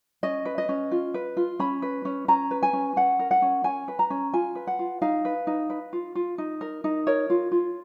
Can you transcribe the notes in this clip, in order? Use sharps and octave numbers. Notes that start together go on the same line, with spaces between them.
C#4 D#5
B4
D#5
C#4
F4
B4
F4
C#4 B5
B4
C#4
C#4 A#5
B4
G#5
C#4
C#4 F#5
A#4
F#5
C#4
C#4 G#5
B4
A#5
C#4
F4 G#5
B4
F#5
F4
D#4 F5
B4
D#4
B4
F4
F4
D#4
A#4
D#4
A#4 C#5
F4
F4